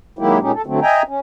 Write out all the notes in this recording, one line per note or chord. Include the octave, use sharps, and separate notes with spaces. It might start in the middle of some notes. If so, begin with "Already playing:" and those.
D#3 F#3 G#3 A#3 E4 G4
A#2 G#3 C#4 D#4 G4
A4
D3 F#3 A3 C4
D#5 E5 G5 G#5 A#5
C#4